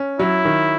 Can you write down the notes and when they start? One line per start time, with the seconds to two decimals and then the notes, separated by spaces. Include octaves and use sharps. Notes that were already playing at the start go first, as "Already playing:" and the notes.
Already playing: C#4
0.19 F#3 E4
0.45 D#3